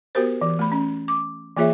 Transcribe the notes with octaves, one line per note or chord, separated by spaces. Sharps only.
B3 F#4 G4 A#4 C5
E3
A3 B5
C#4
D6
E3 A#3 F4 G#4 C#5 E5